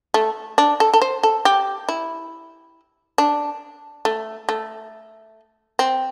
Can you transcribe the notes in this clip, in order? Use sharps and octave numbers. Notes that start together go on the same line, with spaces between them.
A3
D4
A4
A4
C5
A4
G4
E4
D4
A3
A3
C4